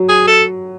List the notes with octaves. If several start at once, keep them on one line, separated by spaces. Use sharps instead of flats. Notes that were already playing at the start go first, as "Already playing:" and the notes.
Already playing: F#3
G#4
A4